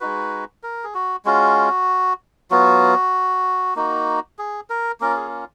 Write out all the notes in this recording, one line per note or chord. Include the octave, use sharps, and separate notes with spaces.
G#3 D#4 F#4 B4
A#4
G#4
F#4
G#3 C#4 F4 F#4
F#3 B3 F4 F#4
A#3 D#4 F#4
G#4
A#4
A#3 C#4 F4 A#4
G#4